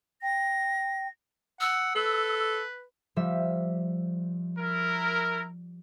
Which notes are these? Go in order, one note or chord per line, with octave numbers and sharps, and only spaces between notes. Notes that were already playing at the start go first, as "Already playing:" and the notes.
G5 A#6
F#5 E6
A4 B4
F3 G3 E5
E4 A#4